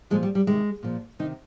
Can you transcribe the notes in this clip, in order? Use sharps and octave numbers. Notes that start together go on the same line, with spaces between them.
A#2 F3 G#3
G3
G3
C3 D#3 G#3
A#2 F3
C3 D#3 D#4